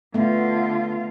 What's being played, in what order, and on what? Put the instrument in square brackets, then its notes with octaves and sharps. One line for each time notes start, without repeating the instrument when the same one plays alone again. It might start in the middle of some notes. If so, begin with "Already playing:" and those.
[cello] D3 F4 [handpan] A3 B3